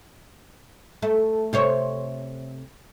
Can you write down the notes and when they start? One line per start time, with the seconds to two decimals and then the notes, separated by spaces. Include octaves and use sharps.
1.02 A3
1.53 C3 C5 C#5